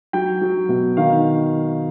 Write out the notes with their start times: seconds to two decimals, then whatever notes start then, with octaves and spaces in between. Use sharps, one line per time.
0.13 F#3 G5
0.41 F#3
0.69 B2
0.97 D#3 F5